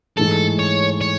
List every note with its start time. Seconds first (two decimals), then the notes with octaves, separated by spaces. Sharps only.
0.18 G#2 E3 A3 A4
0.59 C#5
1.01 C#5